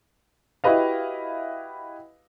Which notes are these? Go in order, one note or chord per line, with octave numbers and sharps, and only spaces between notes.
E4 F#4 G4 B4 D#5 F5